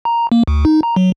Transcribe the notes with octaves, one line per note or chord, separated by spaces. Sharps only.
A#5
A#3
D2
D#4
A#5
F#3